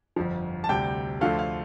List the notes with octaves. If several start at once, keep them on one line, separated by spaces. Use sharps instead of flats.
G1 F2 F3
A5
D2 C3 G3 G5
D2 D3 F3 A3 F5
F5